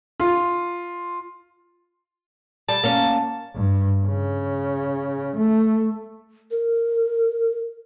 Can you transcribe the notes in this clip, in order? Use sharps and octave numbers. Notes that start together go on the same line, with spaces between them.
F4
G3 A5
A#3 C#4
G2
C#3
A3
A#4